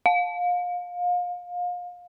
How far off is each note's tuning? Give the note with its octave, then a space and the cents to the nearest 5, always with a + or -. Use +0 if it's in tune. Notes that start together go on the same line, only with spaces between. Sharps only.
F5 +30